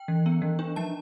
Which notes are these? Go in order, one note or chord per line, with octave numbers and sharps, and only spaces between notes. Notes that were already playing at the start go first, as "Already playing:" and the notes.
Already playing: G5
E3
B3
E3
D4
F3 A5